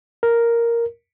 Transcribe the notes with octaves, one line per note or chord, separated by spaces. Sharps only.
A#4